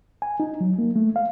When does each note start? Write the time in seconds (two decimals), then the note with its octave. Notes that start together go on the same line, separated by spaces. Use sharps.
0.22 G#5
0.40 D#4
0.61 F#3
0.79 A#3
0.96 A3
1.16 F5